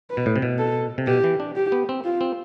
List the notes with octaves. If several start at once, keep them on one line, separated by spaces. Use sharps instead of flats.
B4
B2
A2
C3
B2
A4
C3
B2 G4
E3
D4
G4
B3
C4
F4
C4